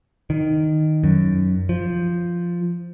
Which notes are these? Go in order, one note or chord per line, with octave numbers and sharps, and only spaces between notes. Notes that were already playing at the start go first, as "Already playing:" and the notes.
D#3
F#2
F3